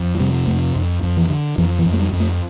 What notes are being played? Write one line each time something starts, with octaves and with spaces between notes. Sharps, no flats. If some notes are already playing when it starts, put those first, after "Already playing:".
Already playing: F2
F3
C3 G3
F2 A3
F2
F2
E3
D3
F2 E3
E3
F2
A3
G3
F2
A3